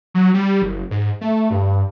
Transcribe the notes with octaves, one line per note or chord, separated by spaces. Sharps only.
F#3
G3
F#1
G#2
A3
G2